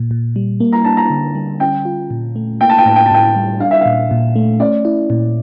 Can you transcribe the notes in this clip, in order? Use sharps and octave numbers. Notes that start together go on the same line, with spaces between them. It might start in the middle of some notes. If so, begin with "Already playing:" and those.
Already playing: A#2
A#2
G3
A#3
A#5
D4 A5
A#5
D3
G3
C#4 G5
F4
A#2
A3
A#3 G5
A5
G5
A2 A5
G5
A5
A2 G5
G3
D4 F5
E5
A#2 F5
A#2
A3
C#4 D5
E4
A#2